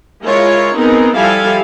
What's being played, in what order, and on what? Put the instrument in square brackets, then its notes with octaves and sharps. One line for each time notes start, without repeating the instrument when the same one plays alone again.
[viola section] G#3 E4 F4 A#4 C#5
B3 C4 D#4 G#4 A#4
F3 G3 E4 A4 F5 G#5